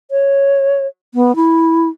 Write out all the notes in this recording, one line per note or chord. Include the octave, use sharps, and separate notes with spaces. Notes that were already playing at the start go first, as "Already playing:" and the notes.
C#5
B3
E4